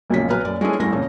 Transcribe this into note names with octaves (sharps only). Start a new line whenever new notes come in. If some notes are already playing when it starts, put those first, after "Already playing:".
E1 B1 A#2 C#3 F3 B6
B1 B4 A#5 F6
F#1 F#2 D5
G#3 C#4 D4 E4 G#4 A4
A1 E2 G2 A3 E4 A#6
F2 A#2 C#3